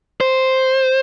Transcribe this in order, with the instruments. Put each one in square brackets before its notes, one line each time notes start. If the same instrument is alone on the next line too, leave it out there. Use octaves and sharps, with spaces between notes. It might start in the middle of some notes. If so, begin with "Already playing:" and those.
[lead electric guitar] C5